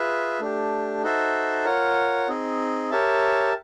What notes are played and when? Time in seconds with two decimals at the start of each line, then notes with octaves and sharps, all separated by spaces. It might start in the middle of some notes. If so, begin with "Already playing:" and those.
Already playing: F4 G#4 B4 E5
0.40 A3 D4 G4
1.03 D#4 F#4 A4 C5 E5
1.65 F4 A#4 C#5 F#5
2.28 C4 D#4 G#4
2.91 G4 A#4 C#5 E5 A5